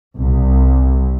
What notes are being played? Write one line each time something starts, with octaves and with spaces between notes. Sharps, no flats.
C2